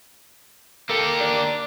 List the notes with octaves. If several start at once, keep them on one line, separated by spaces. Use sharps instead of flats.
A#3 G4 A4 A#4
D4